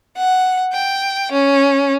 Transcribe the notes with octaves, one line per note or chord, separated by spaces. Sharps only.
F#5
G5
C#4